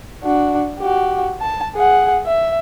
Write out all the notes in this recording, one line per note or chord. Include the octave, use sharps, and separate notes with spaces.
D4 F#4
F#4 G4
A5
G#4 F#5
E5